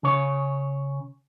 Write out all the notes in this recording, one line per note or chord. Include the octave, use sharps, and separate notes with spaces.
C#3 C#5